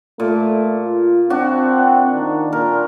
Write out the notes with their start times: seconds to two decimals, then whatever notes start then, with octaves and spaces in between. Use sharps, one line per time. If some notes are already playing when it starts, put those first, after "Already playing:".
0.20 A#2 A3
0.84 F4
1.30 C4 D4 F#4
2.13 D#3
2.53 A#2 A#4